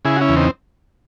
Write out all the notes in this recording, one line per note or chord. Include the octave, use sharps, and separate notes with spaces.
C#3 E4 G#4
F#4
C#4 E4
E2
C4 D#4